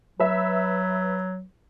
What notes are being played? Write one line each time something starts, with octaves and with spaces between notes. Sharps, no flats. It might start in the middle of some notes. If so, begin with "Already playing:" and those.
F#3 B4 E5